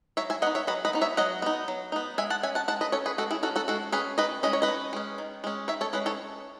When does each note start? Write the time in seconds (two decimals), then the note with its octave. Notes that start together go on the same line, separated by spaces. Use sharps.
0.17 F#3 C#5 E5
0.30 E5 G#5
0.42 B3 D#4 D#5 F#5
0.55 C#5 E5
0.67 F#3 B4 D#5
0.85 B4 D#5
0.93 B3 D#4
1.01 C#5 E5
1.17 F#3 D#5 F#5
1.42 B3 D#4
1.68 F#3
1.92 B3 D#4
2.18 G#3 E5 G#5
2.30 F#5 A5
2.43 C#4 E5 G#5
2.55 F#5 A5
2.68 G#3 F#5 A5
2.81 B4 D#5
2.92 C#4 A4 C#5
3.06 G#4 B4
3.18 G#3 F#4 A4
3.31 E4 G#4
3.43 C#4 F#4 A4
3.56 F#4 A4
3.68 G#3 F#4 A4
3.92 C#4 G#4 B4
4.18 D#3 B4 D#5
4.43 G#3 C#4 D#5
4.53 C#5
4.62 B4 D#5
4.68 D#3
4.93 G#3 C#4
5.18 D#3
5.44 G#3 C#4
5.68 D#3 C#5 E5
5.81 A4 C#5
5.93 G#3 C#4 B4 D#5
6.06 A4 C#5